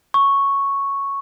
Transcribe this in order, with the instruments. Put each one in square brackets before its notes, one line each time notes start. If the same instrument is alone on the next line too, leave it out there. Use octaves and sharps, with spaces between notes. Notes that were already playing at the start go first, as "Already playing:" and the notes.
[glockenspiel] C#6